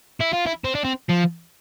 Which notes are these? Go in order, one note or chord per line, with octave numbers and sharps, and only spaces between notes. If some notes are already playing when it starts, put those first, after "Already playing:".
E4
F4
E4
C4
D4
C4
F3